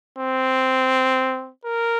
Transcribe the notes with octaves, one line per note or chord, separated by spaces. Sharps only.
C4
A#4